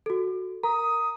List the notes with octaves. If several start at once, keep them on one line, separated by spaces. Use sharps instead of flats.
F#4 A4
A#4 A#5 D#6